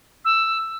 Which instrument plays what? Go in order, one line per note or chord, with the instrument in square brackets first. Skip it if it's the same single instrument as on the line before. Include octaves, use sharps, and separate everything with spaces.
[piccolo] E6